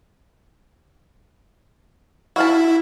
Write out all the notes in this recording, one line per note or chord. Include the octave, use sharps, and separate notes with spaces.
E4 F#4 F5 A5